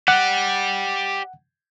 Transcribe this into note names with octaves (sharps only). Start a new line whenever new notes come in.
G4 D5 F#5